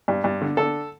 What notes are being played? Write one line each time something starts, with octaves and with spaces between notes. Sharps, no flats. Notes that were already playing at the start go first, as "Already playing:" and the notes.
G2
G2
D3
D3 A4